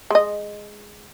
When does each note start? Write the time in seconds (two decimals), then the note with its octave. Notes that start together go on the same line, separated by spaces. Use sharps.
0.10 G#3 D#5